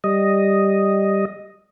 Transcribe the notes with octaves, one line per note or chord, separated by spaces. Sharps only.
G3 D#5